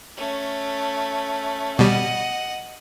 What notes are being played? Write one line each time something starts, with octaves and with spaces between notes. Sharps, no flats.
A3 C#4
B2 G3 D#5 F#5